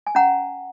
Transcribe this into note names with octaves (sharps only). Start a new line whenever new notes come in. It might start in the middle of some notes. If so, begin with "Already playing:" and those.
G#5
C#4 F#5 A#5